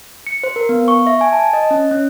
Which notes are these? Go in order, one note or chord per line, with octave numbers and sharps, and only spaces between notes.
C#7
C5
A#4
B3
C#6
E5
G#5
A5
D#5
C#4
C#4